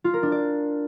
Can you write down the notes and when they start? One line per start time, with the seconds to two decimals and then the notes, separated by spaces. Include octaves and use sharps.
0.04 F4
0.14 A#4
0.23 D4
0.32 D5